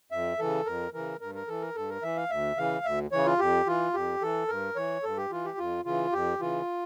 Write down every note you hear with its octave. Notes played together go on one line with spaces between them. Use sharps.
F2 E5
C#3 E3 A4
F2 A#4
C#3 E3 A#4
G2 A#4
A#4
E3 A4
A#4
G2 A4
A#4
E3 E5
F5
D2 E5
C#3 E3 F5
D2 E5
C#3 E3 C#5
F4
F2 G4
E3 F4
F2 G4
E3 A4
G2 A#4
E3 C#5
G2 A4
G4
E3 F4
G4
F2 F4
C#3 E3 F4
F2 G4
C#3 E3 F4